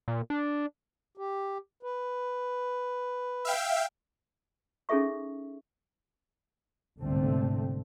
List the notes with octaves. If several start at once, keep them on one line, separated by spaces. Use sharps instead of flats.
A#2
D4
G4
B4
E5 F5 G5
C#4 D#4 G#4 A4 E5 C#6
G1 C2 G#2 D3 A3 C4